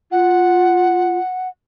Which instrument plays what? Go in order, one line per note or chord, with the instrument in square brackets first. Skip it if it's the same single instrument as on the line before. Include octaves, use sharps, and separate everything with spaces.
[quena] F4 [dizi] F#5